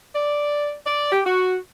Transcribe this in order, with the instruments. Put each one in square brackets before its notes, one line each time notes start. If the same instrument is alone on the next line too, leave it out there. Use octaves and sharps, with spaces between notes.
[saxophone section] D5
D5
G4
F#4